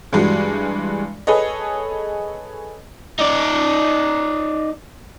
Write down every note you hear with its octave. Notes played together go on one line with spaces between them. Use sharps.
G2 E3 G3 G#3 F#4
G#4 A4 B4 C#5 D#5
D#4 D5